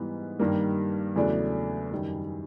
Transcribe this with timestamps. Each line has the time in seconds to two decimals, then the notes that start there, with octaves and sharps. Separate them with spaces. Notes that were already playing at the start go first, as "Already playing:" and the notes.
Already playing: G#2 E3 G3 B3
0.39 G2 D#3 G3 A#3
1.16 E2 C#3 F#3 A3 D4
1.91 F#2 D#3 G3